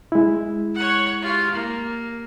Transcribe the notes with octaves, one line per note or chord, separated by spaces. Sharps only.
G#3 E4
C#5 F#5
F4 G4
A#3